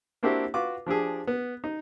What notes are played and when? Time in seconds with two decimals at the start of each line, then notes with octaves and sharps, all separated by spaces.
0.23 A#3 C4 D4 E4 F#4 G4
0.54 F4 F#4 B4 D6
0.86 F3 D4 G4 G#4
1.27 B3
1.64 D#4